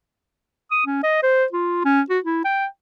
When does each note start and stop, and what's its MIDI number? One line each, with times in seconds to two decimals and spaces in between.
0.71 0.82 87
0.86 1.03 61
1.03 1.22 75
1.23 1.45 72
1.53 1.84 65
1.85 2.01 61
2.10 2.19 66
2.24 2.40 64
2.45 2.66 79